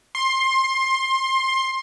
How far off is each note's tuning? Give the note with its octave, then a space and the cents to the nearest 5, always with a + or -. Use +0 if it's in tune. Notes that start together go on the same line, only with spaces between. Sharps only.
C6 +20